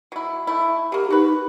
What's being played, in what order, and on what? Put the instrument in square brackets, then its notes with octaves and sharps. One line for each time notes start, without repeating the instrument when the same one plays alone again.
[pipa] F#3 E4
A3 E4
[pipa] F#3 A#3 [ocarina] G4
[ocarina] D#4 [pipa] F#4 B4